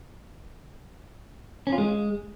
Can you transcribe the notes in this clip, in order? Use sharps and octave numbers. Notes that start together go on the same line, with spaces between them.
C#4
F4
G#3